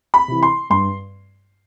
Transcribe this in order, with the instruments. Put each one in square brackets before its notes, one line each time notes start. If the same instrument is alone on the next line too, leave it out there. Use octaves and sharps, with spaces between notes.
[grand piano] B5
C3 E3
C6
G2 C6